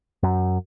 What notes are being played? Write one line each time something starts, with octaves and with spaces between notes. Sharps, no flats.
F#2